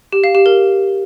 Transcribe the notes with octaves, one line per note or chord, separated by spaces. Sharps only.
G4
F5
G4
A#4